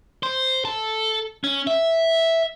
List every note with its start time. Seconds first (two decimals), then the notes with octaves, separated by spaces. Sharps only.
0.23 C5
0.65 A4
1.44 C#4
1.67 E5